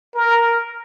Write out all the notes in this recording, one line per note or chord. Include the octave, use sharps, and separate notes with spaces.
A#4